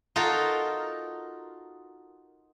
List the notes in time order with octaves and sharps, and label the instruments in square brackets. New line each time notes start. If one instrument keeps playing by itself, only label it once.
[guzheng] D#4 F4 F#4 A4 A#4